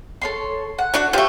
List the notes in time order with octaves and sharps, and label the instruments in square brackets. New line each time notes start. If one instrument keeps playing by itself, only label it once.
[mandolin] A4 C#5 C6
F#5
[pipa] A3 D4 F#4
[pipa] F3 A3 [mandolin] G4 C5 C#5